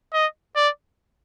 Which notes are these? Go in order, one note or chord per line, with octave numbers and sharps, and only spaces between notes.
D#5
D5